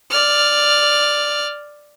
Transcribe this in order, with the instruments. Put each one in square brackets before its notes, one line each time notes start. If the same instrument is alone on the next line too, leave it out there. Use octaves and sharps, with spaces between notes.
[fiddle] D5 F6